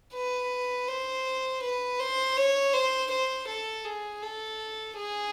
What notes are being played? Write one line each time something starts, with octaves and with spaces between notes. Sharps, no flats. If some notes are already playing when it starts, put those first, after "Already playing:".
B4
C5
B4
C5
C#5
C5
C5
A4
G#4
A4
G#4